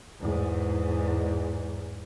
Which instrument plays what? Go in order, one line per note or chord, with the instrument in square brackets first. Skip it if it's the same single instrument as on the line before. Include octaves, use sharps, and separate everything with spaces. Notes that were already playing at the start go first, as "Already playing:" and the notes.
[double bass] E2 G#2